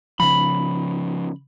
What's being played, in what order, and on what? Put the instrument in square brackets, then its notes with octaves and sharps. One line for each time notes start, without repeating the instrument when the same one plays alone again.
[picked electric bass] C#3 F3 [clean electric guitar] B5